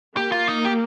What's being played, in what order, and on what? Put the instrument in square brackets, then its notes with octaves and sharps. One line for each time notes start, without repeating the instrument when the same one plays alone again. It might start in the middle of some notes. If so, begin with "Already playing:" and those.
[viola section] A#3 [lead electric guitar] G4
[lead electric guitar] F4
D#4
G4